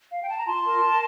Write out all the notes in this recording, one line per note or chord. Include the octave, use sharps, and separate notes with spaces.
F5
G5
A5
A#5
F4 A5 C6
A#4
A#4